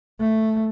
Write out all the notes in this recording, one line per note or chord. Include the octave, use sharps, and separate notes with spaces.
A3